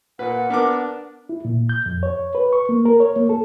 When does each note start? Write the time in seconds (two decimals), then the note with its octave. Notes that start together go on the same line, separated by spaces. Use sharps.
0.19 A#2 B4 F#5
0.50 B3 D4 A#4 D6
1.29 E4
1.45 A#2
1.69 G6
1.86 F2
2.03 C#5
2.35 B4
2.53 C#6
2.69 A#3
2.85 A#4
3.00 C#5
3.16 A#3
3.29 A4